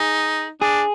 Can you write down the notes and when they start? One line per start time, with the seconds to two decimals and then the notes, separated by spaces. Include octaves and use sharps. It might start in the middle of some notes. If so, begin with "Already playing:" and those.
Already playing: D#4 G#4
0.61 D4 G#4